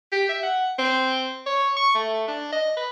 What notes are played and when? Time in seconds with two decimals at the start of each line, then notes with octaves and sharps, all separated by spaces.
0.12 G4
0.29 E5
0.43 F#5
0.79 C4
1.46 C#5
1.77 C#6
1.95 A3
2.28 D4
2.52 D#5
2.77 B4